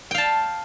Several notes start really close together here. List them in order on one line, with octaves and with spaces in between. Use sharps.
G5 F5 A5